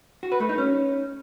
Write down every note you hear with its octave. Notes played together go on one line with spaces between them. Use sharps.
F#4
B4
A3
D#4
C#4